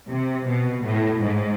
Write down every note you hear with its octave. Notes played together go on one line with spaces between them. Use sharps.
C3
B2
A2
G#2